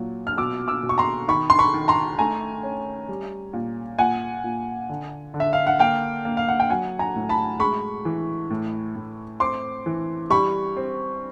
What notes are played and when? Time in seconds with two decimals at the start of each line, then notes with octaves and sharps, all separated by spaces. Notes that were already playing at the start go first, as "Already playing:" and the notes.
Already playing: A#2 F#3
0.27 F6
0.38 B2 D6 E6
0.68 D6 E6
0.83 B2
0.89 C#6
0.98 A#5 C6
1.28 D#3 B5 C#6
1.50 C6
1.59 B5 C#6
1.74 D#3
1.88 A#5 C6
2.19 A3 G#5 A#5
2.63 C#4
3.09 G3
3.53 A#2
3.99 A#2 F#5 G#5
4.44 A#2
4.89 D3
5.34 D3
5.40 E5
5.53 F5
5.67 F#5
5.79 A#3 F5 G5
6.25 A#3
6.37 F5
6.48 F#5
6.60 G5
6.69 F#3 F#5 G#5
6.99 G#5 A#5
7.15 A2
7.29 A5 B5
7.59 G#3 B5 C#6
8.05 E3
8.50 A2
8.96 A2
9.40 C4 C6 D6
9.86 E3
10.30 G3 B5 C#6
10.76 C4